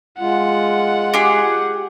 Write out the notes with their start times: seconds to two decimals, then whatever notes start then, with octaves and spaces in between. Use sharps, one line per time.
0.20 G#3 F4 F#5
1.14 G4 G#4